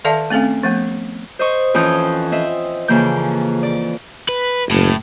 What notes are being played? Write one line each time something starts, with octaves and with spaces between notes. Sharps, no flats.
D#3 A4 D5 E5 F5 A5
A3 C4 C#4 A4 F5
F3 A3 B3
C5 D#5 C#6
F2 E3 C#4 G5 D#6 G6
C4 D#5 E5
F2 C#3 E3 A#3 G6
D5
B4
F#1 A2